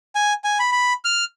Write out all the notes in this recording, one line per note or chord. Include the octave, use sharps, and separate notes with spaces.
G#5
G#5
B5
B5
F6